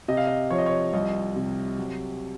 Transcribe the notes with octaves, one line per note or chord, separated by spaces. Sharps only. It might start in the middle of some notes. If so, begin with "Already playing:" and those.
C3 D#5
F5
D#5
F3 C#5
D#5
C#5
C2 D#5
C3
F#3